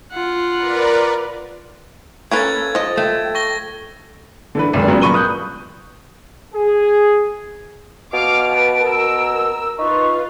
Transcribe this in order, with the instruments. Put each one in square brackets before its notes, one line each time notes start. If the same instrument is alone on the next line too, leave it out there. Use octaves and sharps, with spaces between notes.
[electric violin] F4 F#5
[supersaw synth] A#4 B4 D5
[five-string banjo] A#3 C#4 B4 [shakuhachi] A4 [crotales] G#6 A6
[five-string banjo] F3 D#5
[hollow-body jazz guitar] A3 [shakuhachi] G5
[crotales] C#6 A#6 G7
[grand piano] D3 E3 B4
G#1 C#2 F#2 D3
A#2 C#3 F#3 G3 B3
G1 A#3 B5 C#6 D#7 G7
B4 D#6 F#6 G6
[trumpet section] G#4
[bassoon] B2 [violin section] F5 D6 F6 [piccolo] D7
[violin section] B4 A5
[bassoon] B2 [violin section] A#4 E6
[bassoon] D#4 [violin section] F4 B4 [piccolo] C#6